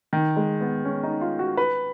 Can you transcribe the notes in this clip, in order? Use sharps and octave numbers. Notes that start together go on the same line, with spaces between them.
D#3
G#3
B3
C#4
D#4
F4
F#4
B4